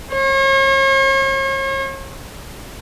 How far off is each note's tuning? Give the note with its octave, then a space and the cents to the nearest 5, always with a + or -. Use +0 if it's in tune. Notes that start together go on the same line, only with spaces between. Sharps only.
C#5 -40